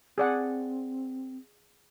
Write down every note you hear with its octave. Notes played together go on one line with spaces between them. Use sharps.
C4 G#4 D5 F#5